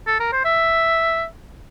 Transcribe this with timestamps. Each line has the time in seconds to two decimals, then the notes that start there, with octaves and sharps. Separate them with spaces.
0.07 A4
0.20 A#4
0.32 C5
0.45 E5